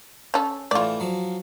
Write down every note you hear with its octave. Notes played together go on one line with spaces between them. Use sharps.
C#4 A4
A2 E3 F4 D5
F3 F#3